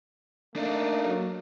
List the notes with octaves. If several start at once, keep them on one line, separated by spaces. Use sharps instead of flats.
A3 A#3 D4 D#4
F#3